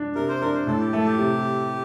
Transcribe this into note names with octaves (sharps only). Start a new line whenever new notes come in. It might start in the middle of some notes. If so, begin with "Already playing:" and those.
Already playing: D4
C3 A#4
C5
D4 A#4
C5
A2 A4
G4
A3 A4
G4
C3